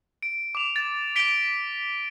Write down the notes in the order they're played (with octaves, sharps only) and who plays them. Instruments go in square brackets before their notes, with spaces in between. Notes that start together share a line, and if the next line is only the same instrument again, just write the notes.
[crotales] D7
D6 F7
A6
B6 D7 G7